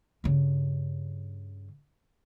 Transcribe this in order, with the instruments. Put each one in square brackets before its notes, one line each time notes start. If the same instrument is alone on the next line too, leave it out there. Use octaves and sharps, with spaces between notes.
[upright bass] G2 C#3